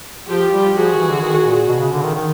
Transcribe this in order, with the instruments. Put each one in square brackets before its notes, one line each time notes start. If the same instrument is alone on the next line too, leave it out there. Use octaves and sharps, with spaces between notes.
[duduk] F3 [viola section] F4 G4
[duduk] G3
[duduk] F3 [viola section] F#4 G#4
[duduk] D#3
E3
D3
D#3
A#2
B2
C#3
D3
D#3
D#3